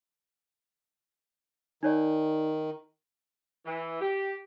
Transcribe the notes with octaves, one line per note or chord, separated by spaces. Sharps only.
D#3 D#4 C#5 D5
E3
G4